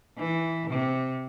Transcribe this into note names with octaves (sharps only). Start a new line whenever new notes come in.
E3
C3